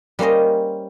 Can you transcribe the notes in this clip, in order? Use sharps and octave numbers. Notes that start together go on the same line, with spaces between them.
G3 A#3 C#4 C5 D#5